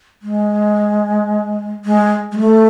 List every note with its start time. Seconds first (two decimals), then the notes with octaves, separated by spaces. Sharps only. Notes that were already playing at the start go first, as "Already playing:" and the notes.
0.22 G#3
1.85 G#3
2.32 G#3
2.39 A3